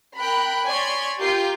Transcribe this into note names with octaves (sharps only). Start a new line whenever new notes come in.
A#4 G5 B5 F#6
C#5 D5 G#5 B5 C6
F4 G4 A#4 G6 C7